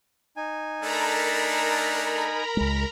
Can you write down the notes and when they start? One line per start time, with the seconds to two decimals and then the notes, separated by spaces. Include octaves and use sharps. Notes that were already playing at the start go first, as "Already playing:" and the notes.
0.37 D#4 G#5
0.82 A3 D4 A4 A#4 A#5 B5
2.57 C#2 G#3